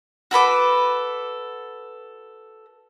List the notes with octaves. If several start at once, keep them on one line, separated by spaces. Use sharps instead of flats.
F#4 A4 B4 D6